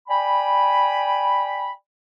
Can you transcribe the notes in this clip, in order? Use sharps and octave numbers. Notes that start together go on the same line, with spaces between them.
D5 G5 G#5 B5